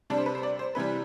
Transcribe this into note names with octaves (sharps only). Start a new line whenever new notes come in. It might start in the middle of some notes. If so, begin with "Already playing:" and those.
C3 G3 D4
C5
B4
C5
D5
C5
C3 E3 G3 B4